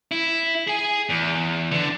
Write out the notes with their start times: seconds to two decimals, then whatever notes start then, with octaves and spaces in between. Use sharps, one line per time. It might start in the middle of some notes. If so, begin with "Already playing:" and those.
0.11 E4
0.67 G#4 G#5
1.09 E2
1.71 D3 D4